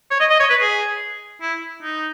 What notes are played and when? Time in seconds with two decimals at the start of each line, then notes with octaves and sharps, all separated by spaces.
0.11 C#5
0.20 D#5
0.30 D#5
0.40 C#5
0.50 B4
0.61 G#4
1.42 E4
1.83 D#4